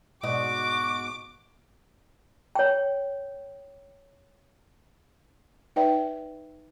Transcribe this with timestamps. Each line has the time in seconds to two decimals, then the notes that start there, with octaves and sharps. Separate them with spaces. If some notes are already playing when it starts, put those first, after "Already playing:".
0.23 G#2 B2 F#4 D#5 D6
2.55 C#5 G5
5.76 D#4 B4 D5 E5 G5